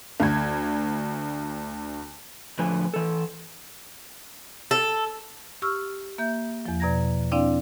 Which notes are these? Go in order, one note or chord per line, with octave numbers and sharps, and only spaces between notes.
D2 G#6
A2 D3 F3 B4 G#5
E3 A4
A4
G4 C#6 E6 F6
A#3 E5 G6
E2 F3
B2 D5 A#5 G#6 A#6
C4 D4 E4 D5 F5 G5